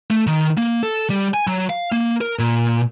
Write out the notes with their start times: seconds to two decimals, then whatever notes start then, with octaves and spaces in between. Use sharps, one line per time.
0.11 A3
0.27 D#3
0.58 A#3
0.83 A4
1.10 G3
1.34 G#5
1.47 F#3
1.70 F5
1.92 A#3
2.21 A#4
2.39 A#2